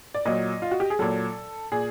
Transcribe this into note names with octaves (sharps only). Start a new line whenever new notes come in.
D5
A#2 F#3 D#5
F4
F#4
G4
G#4
A#2 F#3 A4
A#2 G#4